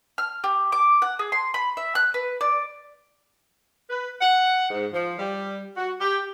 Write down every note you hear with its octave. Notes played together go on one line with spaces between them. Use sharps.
F6
G4
D6
F#5
G#4
C6
B5
E5
F#6
B4
D5
B4
F#5
G#2
F3
G3
F#4
G4